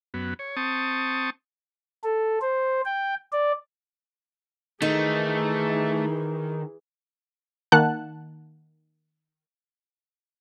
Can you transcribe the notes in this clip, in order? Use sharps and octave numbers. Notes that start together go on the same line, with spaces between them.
F#2 B3
C#5
C4 A5 C#6 D#6
A4
C5
G5
D5
D#3 E3 A3 D#4 G#4
D#3 A#3 F#5 A5 F#6